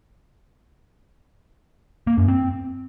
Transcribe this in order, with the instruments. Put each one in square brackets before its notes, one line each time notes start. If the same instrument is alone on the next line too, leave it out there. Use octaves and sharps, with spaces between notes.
[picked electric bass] A#3
F#2
C4